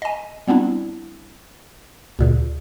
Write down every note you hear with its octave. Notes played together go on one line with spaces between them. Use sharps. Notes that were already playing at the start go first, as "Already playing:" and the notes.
D#5 G#5
G3 B3 C4 D4 E4
D2 A#2 C#3